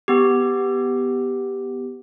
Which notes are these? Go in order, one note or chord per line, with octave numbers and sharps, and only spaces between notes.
B3 G4